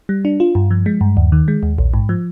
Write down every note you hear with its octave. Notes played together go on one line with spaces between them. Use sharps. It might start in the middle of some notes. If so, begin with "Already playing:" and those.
G3
D4
F4
G2
F3
G#3
G2
D#2
D#3
G#3
D#2
A#1
G#2
F3